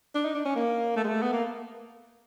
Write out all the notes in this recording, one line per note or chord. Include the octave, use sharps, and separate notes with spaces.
D4
D#4
D4
C#4
A#3
A3
G#3
A3
B3
A#3